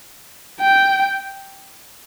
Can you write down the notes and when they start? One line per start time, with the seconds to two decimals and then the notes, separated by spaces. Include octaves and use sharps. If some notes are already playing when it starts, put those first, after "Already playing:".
0.60 G5